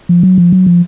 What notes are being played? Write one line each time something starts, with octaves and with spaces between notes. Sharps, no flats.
F3
F#3
F3
F#3
F3